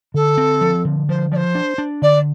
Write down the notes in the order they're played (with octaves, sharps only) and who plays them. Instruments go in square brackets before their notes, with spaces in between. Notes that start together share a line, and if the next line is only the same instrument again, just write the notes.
[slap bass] D3 [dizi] A4
[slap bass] C4
F3
D3
[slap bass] F3 [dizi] C5
[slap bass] F3 [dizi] D5
[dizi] C5
[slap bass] D4
D4
[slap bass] D3 [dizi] D5